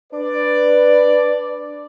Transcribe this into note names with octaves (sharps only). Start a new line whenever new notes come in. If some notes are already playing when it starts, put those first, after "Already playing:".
D4 B4 D5